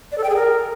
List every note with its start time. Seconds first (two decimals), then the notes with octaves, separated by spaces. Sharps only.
0.12 D5
0.18 A4
0.24 G5
0.30 G#4
0.36 A#4